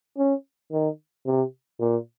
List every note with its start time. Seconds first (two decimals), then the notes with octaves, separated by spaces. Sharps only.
0.18 C#4
0.72 D#3
1.26 C3
1.80 A#2